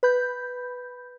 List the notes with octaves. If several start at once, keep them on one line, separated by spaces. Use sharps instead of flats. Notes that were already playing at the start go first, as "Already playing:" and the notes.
B4 B5 G6